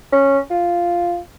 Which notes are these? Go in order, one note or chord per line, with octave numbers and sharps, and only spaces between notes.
C#4
F4